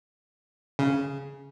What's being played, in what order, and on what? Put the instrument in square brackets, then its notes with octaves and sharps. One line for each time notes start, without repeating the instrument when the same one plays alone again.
[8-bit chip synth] C#3